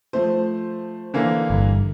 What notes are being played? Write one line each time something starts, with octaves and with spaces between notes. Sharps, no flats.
F3 A3 C5
D3 E3 A#3
G1